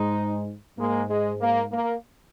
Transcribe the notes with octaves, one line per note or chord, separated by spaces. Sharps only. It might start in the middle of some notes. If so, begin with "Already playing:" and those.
Already playing: G#2 G#3 D#4
G#2 G#3 A#3
G#3
A#3
A#3